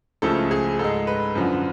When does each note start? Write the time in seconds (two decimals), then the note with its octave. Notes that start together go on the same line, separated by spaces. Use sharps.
0.22 C#2 C#3 F3 A3 A4
0.51 G#4
0.79 G#2 G#3 A4
1.07 B4
1.35 F#2 D3 F3